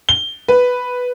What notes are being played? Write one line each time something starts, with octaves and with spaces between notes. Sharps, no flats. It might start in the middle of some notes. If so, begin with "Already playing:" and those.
G7
B4